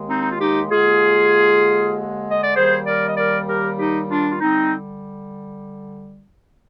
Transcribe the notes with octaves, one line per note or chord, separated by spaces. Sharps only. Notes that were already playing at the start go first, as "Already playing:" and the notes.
Already playing: D#2 D#3 G#3
C4 D#4
D#4
F4
D#4 G4
D#2 D3 G#3 F4 G#4
D#5
D5
D#2 D#3 G3 G#4 C5
A#4 D5
D#5
A#4 D5
G4 A#4
D#4 G4
D4 F4
F4
D3 G3 C4 D#4